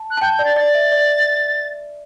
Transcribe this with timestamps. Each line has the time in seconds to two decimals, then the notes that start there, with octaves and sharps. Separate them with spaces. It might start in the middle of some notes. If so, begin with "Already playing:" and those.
Already playing: A5
0.11 F#6
0.17 A5
0.21 G5 G6
0.33 G6
0.39 D5
0.45 A6
0.56 D5 A6
0.75 E5
0.92 D5